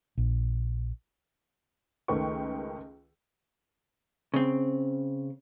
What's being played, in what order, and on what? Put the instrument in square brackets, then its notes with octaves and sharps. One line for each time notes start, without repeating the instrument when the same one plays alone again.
[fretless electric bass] A#1
[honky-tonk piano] C#2 D#3 A3 B4 G5 C#6
[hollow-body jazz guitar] C#3 C4